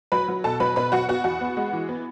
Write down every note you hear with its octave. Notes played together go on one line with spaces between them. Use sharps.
F#3 B4 B5
F#3
B2 A4 A5
F#3 B4 B5
B2 B4 B5
F#3 F#4 F#5
B3 F#4 F#5
E2 F#4 F#5
B3
G#3
E3
B3